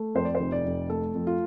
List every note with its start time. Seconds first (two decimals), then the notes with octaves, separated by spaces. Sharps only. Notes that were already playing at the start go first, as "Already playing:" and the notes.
Already playing: A3
0.15 F2 C5
0.25 D5
0.35 C5
0.40 F1
0.52 D5
0.65 F2
0.89 A3 A4
1.15 F2
1.27 F4